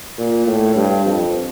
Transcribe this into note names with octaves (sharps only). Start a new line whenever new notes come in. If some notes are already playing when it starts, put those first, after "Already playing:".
A#2
A2
G2
F2